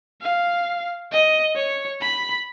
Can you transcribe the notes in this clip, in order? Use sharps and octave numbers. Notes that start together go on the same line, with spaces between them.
F5
D#5
C#5
B5